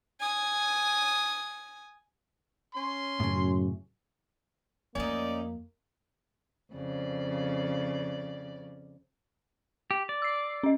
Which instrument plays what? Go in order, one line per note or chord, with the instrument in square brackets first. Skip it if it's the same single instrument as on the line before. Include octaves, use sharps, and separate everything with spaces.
[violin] G#5 D#6
[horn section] C#4 C6
[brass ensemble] F#2 [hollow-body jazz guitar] A2 C#3
[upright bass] F2 A3 [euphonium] A#3 [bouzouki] C#4 D#4 [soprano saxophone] D5
[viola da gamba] F2 C#3 D5
[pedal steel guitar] G4
D5
[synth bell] E6 C7
C#4 D#5